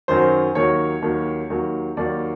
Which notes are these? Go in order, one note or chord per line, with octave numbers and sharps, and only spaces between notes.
F#2 D#3 F#3 C5
D#2 D#3 F#3 C#5
D#2 D#3 F#3
D#2 D#3 F#3
D#2 D#3 F#3 D5